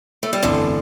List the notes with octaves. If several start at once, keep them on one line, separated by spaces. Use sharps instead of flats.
A3
G3
G1 F2 D3 E3 F3 A3